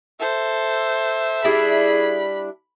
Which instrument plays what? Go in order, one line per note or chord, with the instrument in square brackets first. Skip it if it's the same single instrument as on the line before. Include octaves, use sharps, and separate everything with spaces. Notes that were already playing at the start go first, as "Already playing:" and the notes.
[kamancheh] A4 C5 [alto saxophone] E5
[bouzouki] G3 D4 E4 [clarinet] G#4 [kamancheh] B5